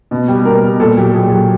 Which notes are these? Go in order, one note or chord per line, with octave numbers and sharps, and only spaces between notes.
B2
G3
B2 A#4
G3
A#2 A4
F#3 G4
A#2 G#4
F#3